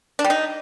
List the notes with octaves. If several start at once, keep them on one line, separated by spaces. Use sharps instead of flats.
D4
G3
D#4